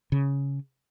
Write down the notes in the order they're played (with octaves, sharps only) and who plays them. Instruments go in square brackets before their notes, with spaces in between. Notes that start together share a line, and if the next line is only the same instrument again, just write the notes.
[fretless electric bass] C#3